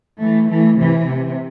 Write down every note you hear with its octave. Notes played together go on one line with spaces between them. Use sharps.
E3 A3
E3 A3
C3 E3
C3